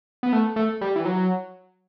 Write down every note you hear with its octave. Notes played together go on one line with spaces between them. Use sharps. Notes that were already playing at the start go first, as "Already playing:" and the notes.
B3
A3
A3
G3
E3
F#3